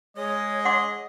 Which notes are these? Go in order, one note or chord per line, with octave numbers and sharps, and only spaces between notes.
G#3 C#5 D#5
F#5 C6 D6